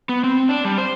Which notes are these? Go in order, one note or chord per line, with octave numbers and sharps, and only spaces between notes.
B3
C4
D4
G3
C5